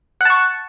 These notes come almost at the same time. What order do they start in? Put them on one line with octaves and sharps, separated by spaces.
F#5 A5 C#6